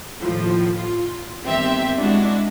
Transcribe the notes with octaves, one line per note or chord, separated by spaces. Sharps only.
D#2 A2 F3
F4
G1 D#3 C4 G4 E5
G#3 D4 E4 F#4